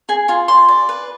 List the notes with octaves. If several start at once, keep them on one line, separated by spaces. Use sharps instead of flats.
G#4 G#5
F4 G#5
D5 C6
D5
B4